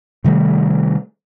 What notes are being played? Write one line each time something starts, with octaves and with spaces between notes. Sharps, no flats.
C3 D#3 G3 A3